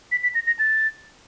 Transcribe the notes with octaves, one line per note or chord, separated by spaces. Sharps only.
B6
B6
A#6
A#6
A6